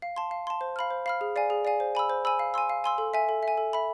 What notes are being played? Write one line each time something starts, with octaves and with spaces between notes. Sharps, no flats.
F5
A5 C6
F5
A5 C6
C5
F5 B5 F6
C5
F5 B5 F6
G#4
D5 F5 G#5
G#4
D5 F5 G#5
C5
G#5 B5 E6
C5
G#5 B5 E6
F5
G#5 C6 E6
F5
G#5 C6 E6
A4
E5 G#5
A4
E5
G#5
A4
E5 B5